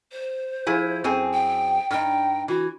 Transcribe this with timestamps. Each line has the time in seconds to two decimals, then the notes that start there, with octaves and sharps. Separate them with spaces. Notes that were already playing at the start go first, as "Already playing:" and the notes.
0.12 C5
0.67 F3 E4 G#4
1.04 F#2 C4 G#4
1.33 G5
1.91 G2 D#4 G5
2.48 E3 F#4